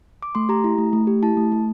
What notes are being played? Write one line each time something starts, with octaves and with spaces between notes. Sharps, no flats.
D6
A3 C6
G4 A#5
E4
A3
A3
G4
E4 A5
A3
A3